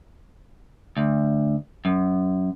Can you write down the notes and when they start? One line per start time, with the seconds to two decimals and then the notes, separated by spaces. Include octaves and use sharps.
0.97 D2
1.85 F#2